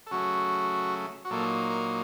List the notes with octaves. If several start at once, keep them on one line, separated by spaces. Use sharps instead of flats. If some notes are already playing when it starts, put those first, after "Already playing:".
A4
C#3 F#3 A3 F#4
F#4
A#2 F#3 A#3 D#4 A4
A#4